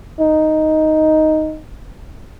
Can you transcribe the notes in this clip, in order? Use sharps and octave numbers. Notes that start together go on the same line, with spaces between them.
D#4